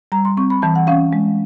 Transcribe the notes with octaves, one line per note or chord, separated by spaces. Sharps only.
G3 A#5
C6
C4 C#6
B5
E3 A5
F#5
C#4 F5
G#3